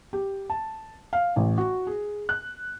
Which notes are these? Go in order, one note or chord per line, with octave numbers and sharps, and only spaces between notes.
G4
A5
F5
A1
F#4
G#4
F#6